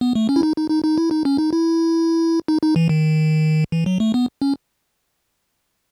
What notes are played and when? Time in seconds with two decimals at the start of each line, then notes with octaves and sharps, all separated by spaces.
0.01 B3
0.15 A3
0.29 C#4
0.36 E4
0.43 D#4
0.56 D#4
0.70 D#4
0.84 D#4
0.98 E4
1.11 D#4
1.25 C#4
1.38 D#4
1.53 E4
2.48 D#4
2.62 D#4
2.76 E3
2.89 D#3
3.72 E3
3.86 F#3
4.00 A3
4.14 B3
4.42 C#4